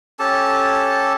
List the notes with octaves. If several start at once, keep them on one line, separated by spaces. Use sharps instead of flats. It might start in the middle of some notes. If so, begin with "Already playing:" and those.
C#4 G4 A4 A5